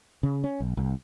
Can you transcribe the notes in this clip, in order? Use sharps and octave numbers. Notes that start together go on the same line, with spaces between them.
C#3
C#4
B1
C2